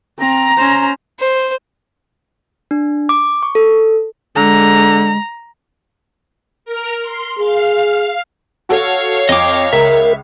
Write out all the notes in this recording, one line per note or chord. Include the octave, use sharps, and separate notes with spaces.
C4 A#5
C#4 C5
C5
D4
D6
C#6
A4
D3 G#3 A#5
A#4 F6
C6
G#4 F5
F#4 A4 C#5 F5
F2 D#5 D6
C#2 A#4 E5